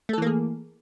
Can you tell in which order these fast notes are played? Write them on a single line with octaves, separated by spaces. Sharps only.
A3 A4 E3 A#3 G#4